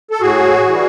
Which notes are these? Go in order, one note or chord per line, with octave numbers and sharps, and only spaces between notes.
A4
A2 F#4 G#4
E3 G3